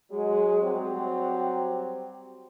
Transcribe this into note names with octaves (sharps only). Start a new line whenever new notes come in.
F#3 G#3
F#3 G3 C4 G4